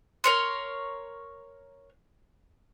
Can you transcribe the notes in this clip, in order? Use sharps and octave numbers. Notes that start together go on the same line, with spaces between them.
A#4 C#5 C6